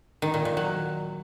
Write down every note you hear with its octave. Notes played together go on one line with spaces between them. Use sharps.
D#3
A#2
A#2
F#3